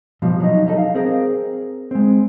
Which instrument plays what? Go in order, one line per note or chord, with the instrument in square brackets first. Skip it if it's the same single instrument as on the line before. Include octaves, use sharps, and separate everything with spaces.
[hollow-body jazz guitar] B2 F3 G3
F#3 D#4
G3 D#4 A4
F5
C4 G#4 A#4
G#3 C4